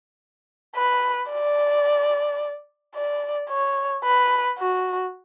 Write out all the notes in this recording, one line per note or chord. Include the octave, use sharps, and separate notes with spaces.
B4
D5
D5
C#5
B4
F#4